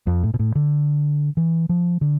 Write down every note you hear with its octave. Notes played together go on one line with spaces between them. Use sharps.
F2
A2
B2
A2
D3
E3
F3
D3